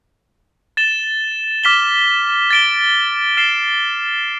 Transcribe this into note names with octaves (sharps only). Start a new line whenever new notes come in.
A6 E7 G7
D6 F6 B6 E7 G7
A6 D7 G7
F6 A6 C7 E7 G7